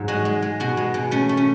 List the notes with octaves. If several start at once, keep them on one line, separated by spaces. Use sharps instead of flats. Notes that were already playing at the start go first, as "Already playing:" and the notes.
Already playing: G#2 F#3
G#3 F#4
G#3
G#3
B2 F#4
G#3
B2
A3 C#4
A3
C#4